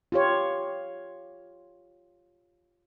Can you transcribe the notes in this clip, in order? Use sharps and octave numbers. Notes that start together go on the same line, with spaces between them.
F4 G4 C#5